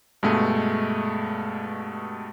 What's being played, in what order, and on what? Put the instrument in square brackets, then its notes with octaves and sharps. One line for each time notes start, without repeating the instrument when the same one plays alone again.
[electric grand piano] G2 B2 G#3 A3